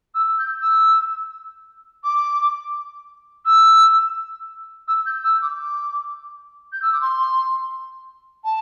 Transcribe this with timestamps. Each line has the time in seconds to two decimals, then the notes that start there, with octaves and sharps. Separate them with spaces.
0.15 E6
0.27 E6
0.38 G6
0.61 E6
2.04 D6
3.46 E6
4.88 E6
5.06 G6
5.24 E6
5.42 D6
5.60 D6
6.73 G6
6.82 E6
6.92 D6
7.01 C6
8.45 A5